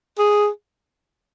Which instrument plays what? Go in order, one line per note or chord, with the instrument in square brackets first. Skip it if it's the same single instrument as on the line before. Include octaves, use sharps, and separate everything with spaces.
[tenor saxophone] G#4